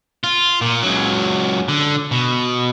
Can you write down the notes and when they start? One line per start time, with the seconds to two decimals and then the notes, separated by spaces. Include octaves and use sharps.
0.24 F4
0.61 A#2
0.83 C#2 F#3
1.68 D3
2.11 B2